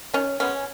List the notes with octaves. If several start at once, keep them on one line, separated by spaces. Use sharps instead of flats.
D#3 C#4
G#3 B3 C#4